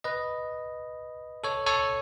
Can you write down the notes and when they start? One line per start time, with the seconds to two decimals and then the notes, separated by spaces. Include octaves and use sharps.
0.04 B4 D#5
1.44 A4 C#5
1.66 A4 C#5